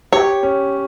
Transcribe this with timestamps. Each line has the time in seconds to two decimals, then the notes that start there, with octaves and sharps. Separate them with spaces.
0.13 G4 C#5
0.43 C#4